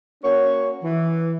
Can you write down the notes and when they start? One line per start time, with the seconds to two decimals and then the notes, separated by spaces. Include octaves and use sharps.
0.23 A#3 C#4 F#4 C#5
0.83 E3